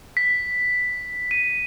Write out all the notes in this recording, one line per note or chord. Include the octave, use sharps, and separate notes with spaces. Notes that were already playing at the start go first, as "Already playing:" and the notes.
B6
D#7